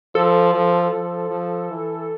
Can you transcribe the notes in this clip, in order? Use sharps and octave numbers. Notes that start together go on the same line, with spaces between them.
F3 A4
F3
F3
F3
E3